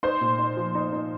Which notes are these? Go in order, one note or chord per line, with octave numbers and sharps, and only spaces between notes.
D#4 C5 C6
A#2
D#4
F3
D#4
D#4